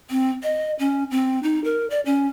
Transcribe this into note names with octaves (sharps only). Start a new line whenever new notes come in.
C4
D#5
C#4
C4
D#4
A#4
D5
C#4